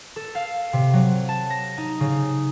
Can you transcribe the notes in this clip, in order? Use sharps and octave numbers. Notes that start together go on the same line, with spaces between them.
A4
F5
C3
F#3
A5
A#6
D#4
C#3